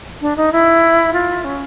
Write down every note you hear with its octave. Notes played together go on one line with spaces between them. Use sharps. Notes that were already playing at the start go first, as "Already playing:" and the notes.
D4
D#4
E4
F4
C#4